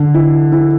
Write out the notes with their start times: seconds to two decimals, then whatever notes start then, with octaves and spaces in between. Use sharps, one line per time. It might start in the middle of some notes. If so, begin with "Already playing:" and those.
Already playing: D3
0.14 E4
0.52 E4